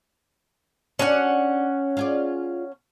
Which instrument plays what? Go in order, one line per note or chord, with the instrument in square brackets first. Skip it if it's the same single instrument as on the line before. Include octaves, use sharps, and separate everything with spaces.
[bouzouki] C#4 F#5 [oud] D4 F#4 D5
[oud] F4 G#4 D5